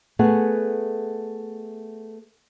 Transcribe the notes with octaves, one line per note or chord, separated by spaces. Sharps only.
A3 B3 G#4 F#5